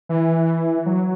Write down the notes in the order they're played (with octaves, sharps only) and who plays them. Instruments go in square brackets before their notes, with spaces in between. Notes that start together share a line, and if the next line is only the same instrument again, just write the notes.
[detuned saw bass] E3
F#3